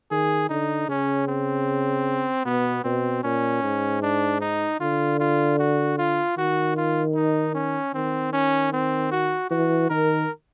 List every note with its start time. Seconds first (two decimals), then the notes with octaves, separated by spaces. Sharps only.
0.11 D#3 G#4
0.49 D3 D#4
0.89 C#3 C#4
1.28 C4
2.46 B2 B3
2.84 B2 C4
3.24 A#2 C#4
3.63 G#2
4.03 D4
4.41 D#4
4.81 D3 F4
5.20 F4
5.59 F#4
5.98 F4
6.37 D#3 F#4
6.77 F4
7.15 D#4
7.55 C#4
7.94 D#3 C4
8.33 C#4
8.73 C4
9.12 F#4
9.51 E3 F#4
9.90 D#3 A#4